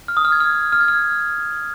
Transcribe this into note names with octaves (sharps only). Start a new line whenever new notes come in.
F6
D#6
F6
G#6
F6
F6
G#6
F6